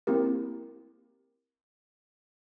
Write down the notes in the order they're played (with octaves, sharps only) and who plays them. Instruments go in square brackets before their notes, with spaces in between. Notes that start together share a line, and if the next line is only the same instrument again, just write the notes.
[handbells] A#3 C4 E4 G4 A#4